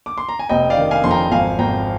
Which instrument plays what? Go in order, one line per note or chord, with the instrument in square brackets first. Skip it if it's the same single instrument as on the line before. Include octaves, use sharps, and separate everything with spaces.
[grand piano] D6
C6
A#5
G#5
F1 D#5 G5
D5 F5
D#3
F5 G#5
F2 C6
G5 A#5
G#1 F5 G#5
G#1 G5 A#5